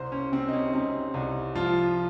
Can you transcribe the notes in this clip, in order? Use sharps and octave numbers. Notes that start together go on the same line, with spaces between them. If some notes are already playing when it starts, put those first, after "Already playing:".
Already playing: C2 C5
C#4
C3 C4
D#4
C#4
C3 D#4
C2
F3 F4